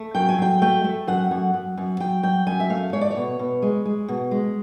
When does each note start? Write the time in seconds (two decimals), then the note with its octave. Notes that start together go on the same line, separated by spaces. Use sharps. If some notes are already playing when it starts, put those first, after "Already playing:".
Already playing: A3
0.15 F#2 G5
0.29 G#5
0.38 F#3 G5
0.62 A3 G5
0.84 A3
1.07 F#2 F#5
1.31 F#2
1.54 F#2
1.77 F#2
2.00 F#3 G5
2.23 F#3 G5
2.46 F#2 G#5
2.60 E5
2.70 A3 F5
2.93 G#3 C#5
3.01 D5
3.11 C#5
3.16 B2
3.39 B2
3.62 G#3
3.85 G#3
4.08 B2
4.31 G#3